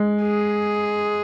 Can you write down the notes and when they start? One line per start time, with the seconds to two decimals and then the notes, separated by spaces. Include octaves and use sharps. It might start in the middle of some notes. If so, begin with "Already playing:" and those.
Already playing: G#3
0.23 G#4